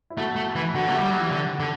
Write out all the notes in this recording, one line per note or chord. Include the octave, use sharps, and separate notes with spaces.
E4
A3 F#4
A3
E3
D3 F#4
F#4
A3
G4
G3
F#3
E3
D3
D3